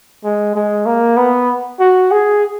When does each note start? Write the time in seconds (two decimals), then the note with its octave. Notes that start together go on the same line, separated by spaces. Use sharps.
0.24 G#3
0.55 G#3
0.86 A#3
1.17 B3
1.80 F#4
2.11 G#4